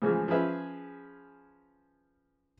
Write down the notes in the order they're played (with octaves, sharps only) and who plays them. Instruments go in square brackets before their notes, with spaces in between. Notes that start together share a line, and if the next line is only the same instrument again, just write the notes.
[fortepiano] A2 C#3 E3 F3 G#3
F3 C#4 G#4 B4 E5